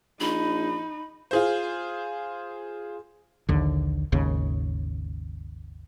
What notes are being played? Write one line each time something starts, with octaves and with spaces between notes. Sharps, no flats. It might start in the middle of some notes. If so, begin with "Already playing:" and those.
A#1 D#4 B5
F4 G#4 C5
A#1 D#2 D3
G#1 D#2 C#3